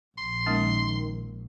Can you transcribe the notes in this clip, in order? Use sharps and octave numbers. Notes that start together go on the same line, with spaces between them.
A#1 C6
D#3 G#3 A#3 C#4